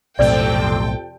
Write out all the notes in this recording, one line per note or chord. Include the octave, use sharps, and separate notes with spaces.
B1 F2 A2 C3 C4 A4 D5 G5